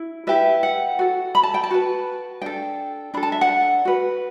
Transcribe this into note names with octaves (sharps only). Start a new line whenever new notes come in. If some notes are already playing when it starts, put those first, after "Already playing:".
Already playing: E4
E4 G4 B4 E5
F#5
F#4 A4
B5
A5
G5
A5
F#4 B4
D4 A4 G5
D4 A4 B5
A5
E5
F#5
F#4 B4